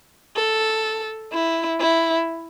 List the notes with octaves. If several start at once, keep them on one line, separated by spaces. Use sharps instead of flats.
A4
E4
E4